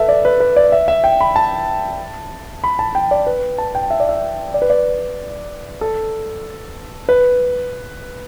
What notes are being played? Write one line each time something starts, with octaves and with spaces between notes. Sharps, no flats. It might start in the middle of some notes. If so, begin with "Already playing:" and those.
Already playing: A4 B4 E5
D5
B4
B4
D5
E5
E5
G5
B5
A5
B5
A5
G5
D5
B4
A5
G5
E5
D5
E5
D5
B4
D5
A4
B4